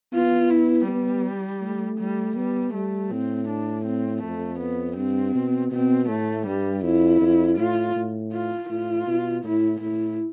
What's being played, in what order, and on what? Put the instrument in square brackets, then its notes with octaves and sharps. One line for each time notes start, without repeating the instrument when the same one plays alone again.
[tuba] B3 [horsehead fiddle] F4
[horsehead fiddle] E4
[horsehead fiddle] G3 [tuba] B3
[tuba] A3
[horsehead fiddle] G3
[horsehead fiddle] G3 [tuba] B3
[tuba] G3 [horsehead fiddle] A3
[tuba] A2 [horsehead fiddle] C4
[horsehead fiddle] D4
C4
[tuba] F2 [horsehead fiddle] A3
[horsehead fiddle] B3
[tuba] G2 [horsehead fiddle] C4
[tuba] B2
[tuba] B2 [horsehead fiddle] C4
[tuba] A2 [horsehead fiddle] A3
[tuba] G2 [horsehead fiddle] G3
[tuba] F2 [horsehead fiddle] E4
[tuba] F2
[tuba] A2 [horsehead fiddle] F4
[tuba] A2
[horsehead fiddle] F4
[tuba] A2 [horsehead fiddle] F4
[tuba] B2
[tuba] A2 [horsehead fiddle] E4
[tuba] A2 [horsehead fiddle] E4